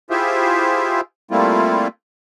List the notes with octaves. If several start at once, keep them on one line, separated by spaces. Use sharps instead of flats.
E4 F4 G4 G#4 C5 E5
G3 A3 A#3 C4 E4 F4